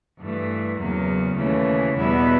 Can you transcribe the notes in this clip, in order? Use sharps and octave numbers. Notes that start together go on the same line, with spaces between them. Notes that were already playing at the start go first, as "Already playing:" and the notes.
G2 E3 A3
E2 C#3 F#3 A#3
D#2 C#3 E3 A3 C#4
E2 B2 G3 B3 E4